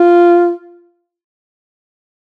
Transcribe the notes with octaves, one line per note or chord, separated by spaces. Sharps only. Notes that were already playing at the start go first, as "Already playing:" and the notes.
Already playing: F4